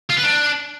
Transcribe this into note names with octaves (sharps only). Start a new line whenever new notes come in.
F4
B4
D4